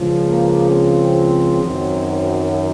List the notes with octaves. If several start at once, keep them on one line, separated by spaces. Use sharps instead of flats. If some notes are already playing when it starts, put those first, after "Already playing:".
Already playing: C#2 C#3 F3
A#3
C4
F#2 D#3 F#3